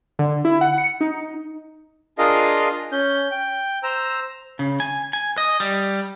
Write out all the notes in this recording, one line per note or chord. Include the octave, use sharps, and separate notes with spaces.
D3
E4
F#5
C#7
D#4
D4 F4 G#4 A#4 D#5 F5
C#4 G6
G5
C5 A#5 E6
C#3
G#5
G#5
D#5
G3